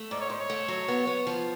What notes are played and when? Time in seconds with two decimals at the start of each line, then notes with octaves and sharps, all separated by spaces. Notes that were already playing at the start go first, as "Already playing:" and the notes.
Already playing: A3
0.11 G#2 D5
0.21 C#5
0.30 G#2 C5
0.40 C#5
0.50 A3
0.68 F#3
0.88 B3
1.07 B3
1.27 F3